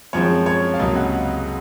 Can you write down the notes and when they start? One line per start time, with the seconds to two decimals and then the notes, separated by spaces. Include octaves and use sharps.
0.13 F#2 F3 G#3 C4 C#5
0.46 C#5
0.74 F5
0.79 C#2 C3 F#3 A#3 D#5
0.96 F#5